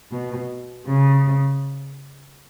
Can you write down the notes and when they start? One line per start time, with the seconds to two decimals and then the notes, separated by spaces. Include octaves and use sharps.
0.12 B2
0.87 C#3